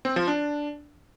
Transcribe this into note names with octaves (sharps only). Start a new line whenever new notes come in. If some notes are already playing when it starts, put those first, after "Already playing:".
C4
F3
D4